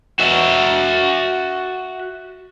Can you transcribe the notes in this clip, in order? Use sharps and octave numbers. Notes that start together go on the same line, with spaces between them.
F#4 E5